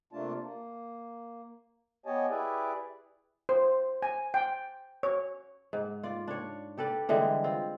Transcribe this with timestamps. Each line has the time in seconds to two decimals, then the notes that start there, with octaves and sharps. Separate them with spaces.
0.13 C3 A3 A#3 D4 F4 A5
0.42 A#3
2.06 B3 G4 C#5 D#5 G#5 A5
2.30 E4 G4 G#4 B4 D5 E5
3.49 C5
4.02 G#5
4.34 G5
5.03 C#5
5.73 G#2
6.03 F4 D5
6.28 D4 C#5
6.78 G4 A4 B4 D5
7.09 D3 E3 G3 G#3
7.44 C4 F4